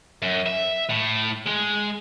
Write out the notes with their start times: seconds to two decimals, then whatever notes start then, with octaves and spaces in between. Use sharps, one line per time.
0.22 F#2
0.47 E5
0.90 A2
1.47 G#3